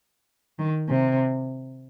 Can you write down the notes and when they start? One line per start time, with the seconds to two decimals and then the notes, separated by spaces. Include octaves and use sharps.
0.59 D#3
0.89 C3